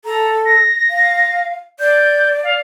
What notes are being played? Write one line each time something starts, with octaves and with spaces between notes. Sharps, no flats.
A4 A#5
A#6
F5
D5 G6
F5